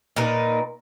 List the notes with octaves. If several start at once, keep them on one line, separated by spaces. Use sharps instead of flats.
A#2 D#4 A#4 B4